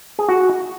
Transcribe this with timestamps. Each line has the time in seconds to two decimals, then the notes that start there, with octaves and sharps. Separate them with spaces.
0.19 G#4
0.29 F#4